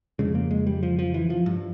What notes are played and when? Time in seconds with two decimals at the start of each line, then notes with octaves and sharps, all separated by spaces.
0.19 F2 C#3 G#3
0.35 A#3
0.51 G#3
0.67 G3
0.83 F3
0.99 F3
1.14 E3
1.30 F3
1.46 G2